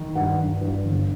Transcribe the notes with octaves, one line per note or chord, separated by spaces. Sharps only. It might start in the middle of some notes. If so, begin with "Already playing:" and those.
Already playing: D#3
G2 F#5
G2
G2
G1